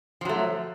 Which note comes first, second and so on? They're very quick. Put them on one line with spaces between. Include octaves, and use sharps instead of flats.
F3 F#3 A3